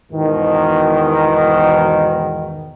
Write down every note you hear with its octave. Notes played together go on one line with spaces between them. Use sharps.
E2 G#2 B2 D#3